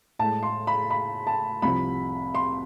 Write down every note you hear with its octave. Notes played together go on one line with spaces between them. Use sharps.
A2 G#3 A5
C6
B5
B5
A5
C2 C3 F3 B5
C6